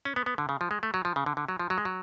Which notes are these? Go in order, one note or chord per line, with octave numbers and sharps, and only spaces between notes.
C#4
B3
B3
D3
C#3
F3
G#3
A3
F#3
F3
C#3
D3
D3
F#3
F3
F#3
G#3
F#3